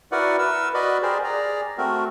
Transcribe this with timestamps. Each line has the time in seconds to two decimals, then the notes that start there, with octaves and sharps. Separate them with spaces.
0.12 E4 F#4 A#4 B4 D5 F#5
0.39 A#4 B4 E6
0.74 F#4 B4 D5 D#5 B5
1.02 G4 G#4 A#4 C5 D5
1.24 G#4 D5 A#5
1.78 A3 C4 F#4 A#4